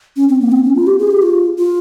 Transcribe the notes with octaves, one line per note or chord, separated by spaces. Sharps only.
C#4
C4
A#3
C4
C#4
F4
G4
G#4
G4
F4
F4